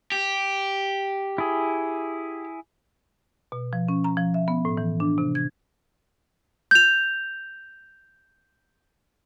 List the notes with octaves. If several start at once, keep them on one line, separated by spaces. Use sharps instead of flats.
G4
E4 G#4
B2
F3
C#4
A#5
F3
E5
B3
A2
E3
D4
C3
G#6
G6 F7